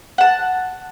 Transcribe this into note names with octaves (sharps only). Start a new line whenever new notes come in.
F#5 A5